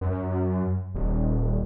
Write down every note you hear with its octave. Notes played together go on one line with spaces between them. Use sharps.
F#2
D#1